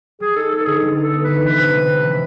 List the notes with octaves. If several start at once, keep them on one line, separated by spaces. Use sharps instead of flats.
G3 G#4
D#4 A4
B3 A4
A4
D3 G#4
G3
D#4 A4
B3
D3 B4
E3 B4
C3
G#3
C3
E3